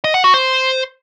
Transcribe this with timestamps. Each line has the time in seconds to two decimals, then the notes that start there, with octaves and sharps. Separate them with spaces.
0.04 D#5
0.14 F#5
0.24 F#4
0.34 C5